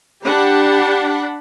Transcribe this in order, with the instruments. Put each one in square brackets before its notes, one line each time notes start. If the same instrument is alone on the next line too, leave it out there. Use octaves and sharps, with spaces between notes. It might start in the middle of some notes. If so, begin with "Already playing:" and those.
[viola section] D4 F#5 B5 [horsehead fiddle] G4